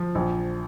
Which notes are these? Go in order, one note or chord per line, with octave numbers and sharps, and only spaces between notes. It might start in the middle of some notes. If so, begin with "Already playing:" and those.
Already playing: F3
A#1